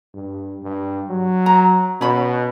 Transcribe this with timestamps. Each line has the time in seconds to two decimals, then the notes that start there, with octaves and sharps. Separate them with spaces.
0.14 G2
0.63 G2
1.10 F#3
1.46 A#5
2.01 B2 C#4 B5